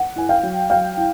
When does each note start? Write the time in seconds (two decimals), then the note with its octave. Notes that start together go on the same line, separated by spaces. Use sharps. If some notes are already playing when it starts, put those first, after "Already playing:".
Already playing: F#5
0.16 E4 G#5
0.29 F5 G5
0.43 F#3
0.70 F#3 F5 G5
0.97 E4